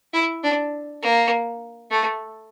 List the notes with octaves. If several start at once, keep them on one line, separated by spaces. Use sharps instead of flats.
E4
D4
A#3
A3